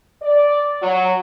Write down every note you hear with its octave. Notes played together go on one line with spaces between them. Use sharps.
D5
F#3